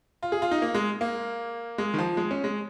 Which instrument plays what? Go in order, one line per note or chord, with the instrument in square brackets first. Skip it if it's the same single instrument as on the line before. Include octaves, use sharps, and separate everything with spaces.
[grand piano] F4
G#4
F4
D#4
A#3
G#3
A#3
G#3
D#3
F3
G#3
C#4
G#3